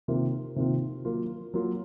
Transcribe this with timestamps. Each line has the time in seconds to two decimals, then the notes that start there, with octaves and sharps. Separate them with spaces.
0.08 C3 D#3 A#3 F4
0.56 C3 D#3 A#3 F4
1.05 F#3 A#3 F4
1.54 F#3 A#3 F4